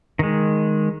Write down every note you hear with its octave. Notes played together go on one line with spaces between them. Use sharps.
D#3 G#3